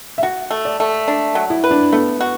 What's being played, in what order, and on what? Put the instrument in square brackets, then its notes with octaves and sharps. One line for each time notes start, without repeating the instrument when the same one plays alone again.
[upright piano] E5
[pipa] F#4 [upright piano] F#5
[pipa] A3
[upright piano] D5
[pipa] A3
D4
F#3
[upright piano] E4
[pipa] B4
[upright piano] D4
[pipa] A3 [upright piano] B3
[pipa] F#4